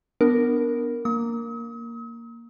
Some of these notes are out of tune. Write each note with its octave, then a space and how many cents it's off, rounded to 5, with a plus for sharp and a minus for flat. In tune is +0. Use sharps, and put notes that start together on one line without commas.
B3 +0 D4 +0 A#4 +0
A#3 +0 D#6 +45